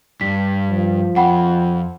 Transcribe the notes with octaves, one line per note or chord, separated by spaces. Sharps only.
G2 B6
F3
F2 F#5 G5 B5